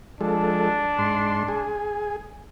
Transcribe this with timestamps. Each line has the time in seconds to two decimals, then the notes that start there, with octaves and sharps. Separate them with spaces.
0.21 F3 G#3 D4 A4
0.99 G#2 C6
1.48 G#4